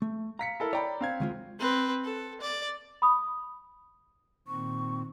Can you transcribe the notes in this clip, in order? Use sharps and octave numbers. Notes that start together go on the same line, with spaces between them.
A3
F5 A#5 B6 C#7
E4 A4 A#4
C#5 D5 G5 A#5 B5
C4 F5 G#6
D2 G#3 F4
C4 B4
A4
D5
B5 D#6
A#2 D#3 C4 C#6